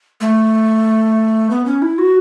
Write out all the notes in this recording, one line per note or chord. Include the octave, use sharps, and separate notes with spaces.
A3
B3
C#4
E4
F#4